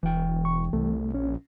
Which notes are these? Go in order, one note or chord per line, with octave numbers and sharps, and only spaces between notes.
E1 E3 G5
C#6
C2 A3
A#1 C#4